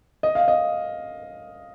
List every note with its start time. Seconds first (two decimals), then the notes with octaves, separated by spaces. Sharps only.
0.23 D#5
0.35 F5
0.48 D#5